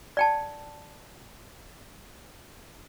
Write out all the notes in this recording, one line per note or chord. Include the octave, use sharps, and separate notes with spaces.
D5 G5 A5